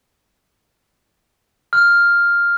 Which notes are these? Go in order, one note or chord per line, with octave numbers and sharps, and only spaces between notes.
F6